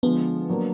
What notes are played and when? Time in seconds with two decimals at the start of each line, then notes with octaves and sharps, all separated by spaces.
0.03 D3 F3 G#3 B3
0.49 F#3 A#3 D4